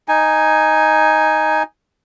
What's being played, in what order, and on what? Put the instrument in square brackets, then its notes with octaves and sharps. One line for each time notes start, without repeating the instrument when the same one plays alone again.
[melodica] D#4 G#5